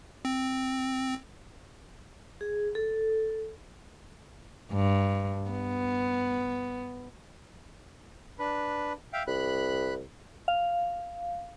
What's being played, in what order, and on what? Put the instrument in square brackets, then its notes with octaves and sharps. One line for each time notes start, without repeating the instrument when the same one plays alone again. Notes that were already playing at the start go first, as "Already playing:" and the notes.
[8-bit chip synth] C4
[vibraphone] G#4
A4
[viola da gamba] G2
B3
[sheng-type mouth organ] D4 B4
E5 F5 G5
[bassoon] C2 [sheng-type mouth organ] B5 F#6
[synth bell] F5